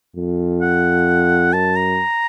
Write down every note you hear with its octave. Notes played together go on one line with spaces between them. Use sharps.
F2
F#5
F#2 A5
A#5